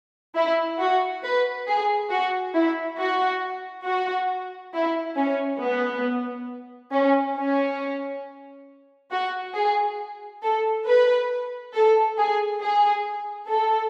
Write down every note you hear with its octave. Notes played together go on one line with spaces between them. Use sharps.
E4
F#4
B4
G#4
F#4
E4
F#4
F#4
E4
C#4
B3
C#4
C#4
F#4
G#4
A4
B4
A4
G#4
G#4
A4